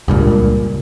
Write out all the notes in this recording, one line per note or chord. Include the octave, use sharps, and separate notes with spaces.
C#2 G2 A#2